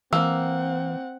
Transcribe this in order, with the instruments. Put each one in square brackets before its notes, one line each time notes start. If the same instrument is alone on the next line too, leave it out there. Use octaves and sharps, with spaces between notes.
[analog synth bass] E3 [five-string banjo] A#3 [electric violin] C4 F#5 [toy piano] E6